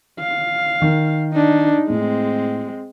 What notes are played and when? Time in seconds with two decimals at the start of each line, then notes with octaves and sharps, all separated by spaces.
0.20 F5
0.82 D#3
1.32 D4 D#4
1.90 A2 G#3 C4